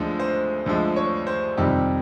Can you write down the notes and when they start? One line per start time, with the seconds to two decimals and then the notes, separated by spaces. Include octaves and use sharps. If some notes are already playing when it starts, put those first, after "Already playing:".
Already playing: D2 D3 F3 G#3
0.20 C5
0.66 D2 D3 F3 G#3
0.96 C#5
1.27 C5
1.57 F2 C3 D#3 G3 G4